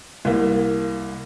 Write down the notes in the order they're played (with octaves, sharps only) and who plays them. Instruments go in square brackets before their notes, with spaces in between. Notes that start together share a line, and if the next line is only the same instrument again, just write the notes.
[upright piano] C2 A#3